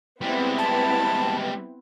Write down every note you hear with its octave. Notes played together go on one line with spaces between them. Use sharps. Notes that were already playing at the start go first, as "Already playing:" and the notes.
G3 G#3 B3 C4 E4
A5